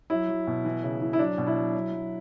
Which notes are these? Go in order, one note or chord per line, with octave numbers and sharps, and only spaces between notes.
F#3 E4
F#3
B2
E3
C#3
E3
E4
F#3 D4
B2
E4
F#3
F#3
F#3